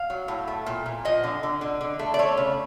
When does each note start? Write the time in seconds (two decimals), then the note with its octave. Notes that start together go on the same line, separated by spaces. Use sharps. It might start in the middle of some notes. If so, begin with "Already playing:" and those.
Already playing: F5
0.10 F#3
0.28 A2
0.48 A3
0.66 A#2
0.86 A#2
1.05 F3 D#5
1.24 D3
1.43 D3
1.61 D3
1.81 D3
1.99 A3
2.14 D5
2.19 A3 C#5
2.37 C#3